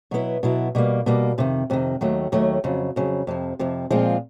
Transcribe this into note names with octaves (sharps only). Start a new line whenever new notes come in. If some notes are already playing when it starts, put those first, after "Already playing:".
B2 F#3 B3 E4
B2 F#3 B3 E4
B2 G3 A#3
B2 G3 A#3
F2 C3 D#3
F2 C3 D#3
D#2 D#3 F#3 A3
D#2 D#3 F#3 A3
F2 C#3 F#3
F2 C#3 F#3
F2 C3 F3
F2 C3 F3
A#2 F3 G#3 C4 F4